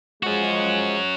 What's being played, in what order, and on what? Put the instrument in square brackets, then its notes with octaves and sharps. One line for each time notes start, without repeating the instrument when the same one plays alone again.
[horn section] F3 G#3 [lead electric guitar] C#4 F#4